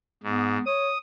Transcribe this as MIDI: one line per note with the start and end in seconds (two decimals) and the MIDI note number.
0.23 0.58 44
0.23 0.64 59
0.66 0.91 73
0.66 0.98 87